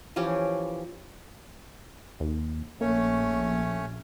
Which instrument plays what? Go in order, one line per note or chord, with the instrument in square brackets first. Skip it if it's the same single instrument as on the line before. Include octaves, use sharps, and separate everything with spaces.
[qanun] E3 F3 C#4 G4
[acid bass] D#2
[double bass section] A#1 [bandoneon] A3 C#4 C#5 [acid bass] A#3